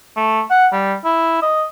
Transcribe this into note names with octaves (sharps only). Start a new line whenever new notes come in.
A3
F#5
G3
E4
D#5